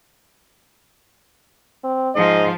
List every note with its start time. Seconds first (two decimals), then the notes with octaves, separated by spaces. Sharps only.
1.84 C4
2.16 G#2 F3 F4 D#5